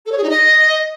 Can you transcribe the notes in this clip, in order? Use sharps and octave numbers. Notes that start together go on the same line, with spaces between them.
A4
C#5
G#4
D#4
D#5